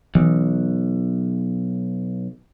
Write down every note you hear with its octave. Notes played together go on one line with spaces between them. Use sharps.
B1 E3